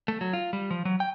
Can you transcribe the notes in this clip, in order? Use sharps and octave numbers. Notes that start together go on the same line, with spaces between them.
A3
F#3
F4
G3
F3
F#3
G5